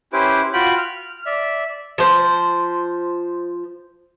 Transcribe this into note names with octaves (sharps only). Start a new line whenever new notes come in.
C#4 E4 G4 B4 C5 D6
F4 F#4 G5 B5
F6
D5 E5
F3 C5